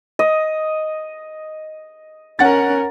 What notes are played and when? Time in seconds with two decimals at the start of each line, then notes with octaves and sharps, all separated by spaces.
0.19 D#5
2.39 C#4 A#4 F#5 A6